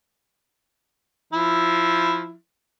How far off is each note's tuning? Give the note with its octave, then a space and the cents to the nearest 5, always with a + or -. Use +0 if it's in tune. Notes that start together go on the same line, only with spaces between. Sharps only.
F3 +0 E4 +0